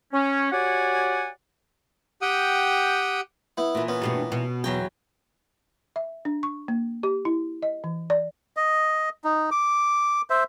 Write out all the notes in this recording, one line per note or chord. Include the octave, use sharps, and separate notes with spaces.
C#4
F#4 G4 C#5 D5 F#5 G#5
G4 F#5 G5 D#6
B3 E4
A#2 E3
B3 C#4
G2 B2 A3
B2
E2 F#3 G5
E5
D4
C#6
A#3
G4
E4
D#5
E3
D5
D#5
D#4
D6
C5 E5